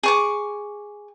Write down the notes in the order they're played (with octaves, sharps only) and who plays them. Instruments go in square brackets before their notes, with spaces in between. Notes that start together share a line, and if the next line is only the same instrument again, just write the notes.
[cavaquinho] G#4 C#6 D6